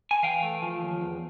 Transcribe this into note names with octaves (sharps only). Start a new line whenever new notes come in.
G#5
E3 F5 G5
A3
F3
D#2
E2